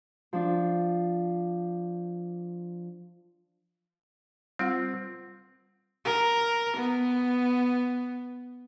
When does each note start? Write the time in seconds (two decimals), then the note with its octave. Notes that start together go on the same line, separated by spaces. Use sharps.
0.33 F3 D4
4.59 G3 C4 F4 F#5
6.05 A#4
6.77 B3